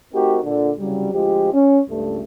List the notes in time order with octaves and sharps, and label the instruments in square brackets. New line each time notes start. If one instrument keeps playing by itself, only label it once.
[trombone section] A3 C4 D#4 F#4 G4 A#4
A#2 D3
C2 C#3 F#3 G3
D2 F3 G#3 F4 G4
C#4
C#2 G2 A3